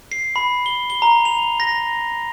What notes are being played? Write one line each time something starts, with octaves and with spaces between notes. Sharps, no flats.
C7
B5
G7
G7
A#5
F7
A#6